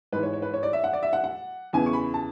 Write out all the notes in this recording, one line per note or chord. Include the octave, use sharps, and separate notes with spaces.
G#2 E3 B4
C#5
C#5
B4
C#5
D5
E5
F#5
D5
E5
F#5
F#5
E2 C#3 E3 G#5
C#6
B5
A5